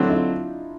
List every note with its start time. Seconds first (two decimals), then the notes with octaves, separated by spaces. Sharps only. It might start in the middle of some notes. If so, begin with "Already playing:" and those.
Already playing: D3 F#3 A3 C4 D4 E4
0.09 D#4 F4